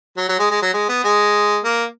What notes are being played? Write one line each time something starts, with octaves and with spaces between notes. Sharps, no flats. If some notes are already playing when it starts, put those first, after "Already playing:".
F#3
F#3
G#3
G#3
F#3
G#3
B3
G#3
A#3